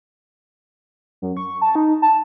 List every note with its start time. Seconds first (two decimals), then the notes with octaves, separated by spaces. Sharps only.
1.22 F#2
1.37 C#6
1.61 A5
1.75 D#4
2.02 A5